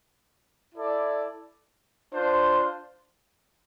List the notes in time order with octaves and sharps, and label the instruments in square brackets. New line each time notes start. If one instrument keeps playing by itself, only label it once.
[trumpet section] E4 A4 D5
D4 F4 C5